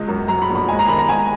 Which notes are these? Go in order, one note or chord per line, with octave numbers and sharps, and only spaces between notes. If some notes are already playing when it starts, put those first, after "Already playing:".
Already playing: C#2 G#3
F#2
F#3 A#5
B5
A#1
B5
G#3 G#5
A#5
D#2 B5
A#5
G#3 G#5